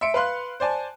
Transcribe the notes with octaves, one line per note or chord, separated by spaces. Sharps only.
E5 C6 C#7 D7
B4 F5 C6 F#6
C5 D5 G#5 A5